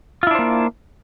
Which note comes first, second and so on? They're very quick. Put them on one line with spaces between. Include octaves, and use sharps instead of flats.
F4 E4 D4 C5 A#3